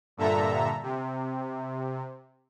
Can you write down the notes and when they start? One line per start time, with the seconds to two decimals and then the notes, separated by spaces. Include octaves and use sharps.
0.17 G2 A#2 D3 A4 E5 A#5
0.83 C3